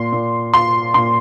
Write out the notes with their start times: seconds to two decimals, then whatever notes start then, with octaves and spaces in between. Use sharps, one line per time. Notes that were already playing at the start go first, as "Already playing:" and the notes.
Already playing: A#2 C6
0.13 A#2
0.54 F4 C6
0.94 A#2 C6